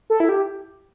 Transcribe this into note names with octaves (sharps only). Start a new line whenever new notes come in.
A4
E4
G4